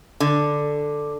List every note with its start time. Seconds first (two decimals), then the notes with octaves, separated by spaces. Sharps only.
0.20 D3